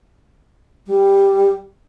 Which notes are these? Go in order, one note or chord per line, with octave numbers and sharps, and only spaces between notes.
G3